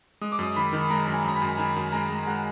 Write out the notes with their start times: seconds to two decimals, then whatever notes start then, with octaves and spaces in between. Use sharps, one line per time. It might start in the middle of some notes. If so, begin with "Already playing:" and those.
0.21 G#3 D#6
0.32 D6
0.39 F#2 D#6
0.56 D#3 B5
0.73 D#3
0.90 G#3 A#5
1.07 F#2
1.14 G#5
1.24 F#2 A#5
1.35 B5
1.42 F#2
1.58 D#3 G#5
1.76 F#2
1.92 G#3 A#5
2.10 G#3
2.27 G#3 F#5